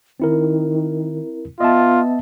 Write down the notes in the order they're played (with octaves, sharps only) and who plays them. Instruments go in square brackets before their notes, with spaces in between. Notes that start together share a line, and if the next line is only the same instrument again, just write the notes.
[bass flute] D#3 [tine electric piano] C4 E4 A#4
[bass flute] B3 [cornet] F4 [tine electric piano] D#5 E5 A5